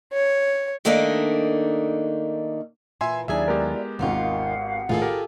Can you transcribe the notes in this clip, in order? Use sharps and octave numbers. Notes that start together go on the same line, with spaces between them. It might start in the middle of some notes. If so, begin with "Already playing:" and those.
C#5
D#3 A3 A#3 D4 D#4
A#2 E3 E5 G#5 C6
D#2 F#3 D4 E4 G#4 D5 E5 G#5
G#3 B3 G4 A#4
G#1 D#2 G#2 D#3 F4 F5 F#5
A#1 A2 D#3 F4 G#4 A4
G4 A#4